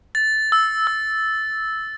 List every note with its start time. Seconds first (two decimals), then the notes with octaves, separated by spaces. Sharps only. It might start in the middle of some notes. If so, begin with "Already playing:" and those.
0.15 A6
0.52 E6
0.87 E6